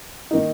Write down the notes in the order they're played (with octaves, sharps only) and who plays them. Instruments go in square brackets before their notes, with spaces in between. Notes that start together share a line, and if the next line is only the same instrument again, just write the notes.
[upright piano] D#3 A#3 D#4